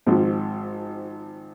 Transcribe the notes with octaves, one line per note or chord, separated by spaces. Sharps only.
G#1 G#2 F3 C4